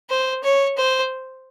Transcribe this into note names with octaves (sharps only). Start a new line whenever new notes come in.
C5
C#5
C5